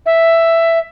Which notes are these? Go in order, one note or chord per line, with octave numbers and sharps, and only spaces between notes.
E5